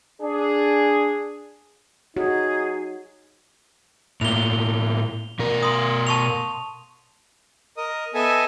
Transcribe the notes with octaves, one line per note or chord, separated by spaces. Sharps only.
D4 G#4
F#3 D#4 F#4 G#4
A2 A#3 F7 G7
B2 A#4
C6 D#6
A5 C#6 F7
A#4 D#5 D#6
B3 A4 D#5 E5 G#5